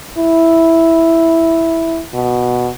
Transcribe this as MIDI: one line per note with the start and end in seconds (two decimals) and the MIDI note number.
0.17 2.02 64
2.13 2.70 47